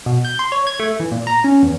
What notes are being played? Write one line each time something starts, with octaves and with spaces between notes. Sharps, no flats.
B2
G6
C6
C#5
G#6
A3
E3
A#2
A#5
C#4
E2